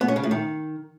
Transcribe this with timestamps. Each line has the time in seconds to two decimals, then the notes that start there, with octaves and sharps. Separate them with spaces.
0.01 B3
0.08 C#4
0.16 C#3
0.23 A2
0.31 D#3